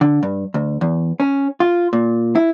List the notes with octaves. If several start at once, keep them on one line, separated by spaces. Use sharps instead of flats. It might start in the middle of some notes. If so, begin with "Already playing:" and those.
D3
G2
D2
E2
C#4
F4
A#2
E4